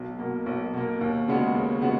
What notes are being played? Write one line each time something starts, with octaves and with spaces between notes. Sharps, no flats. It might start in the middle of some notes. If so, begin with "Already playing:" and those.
Already playing: B1
B2 A#3
B1
B2 A#3
D#2
C#3 G#3 B3 F#4
D#2
C#3 G#3 B3 F#4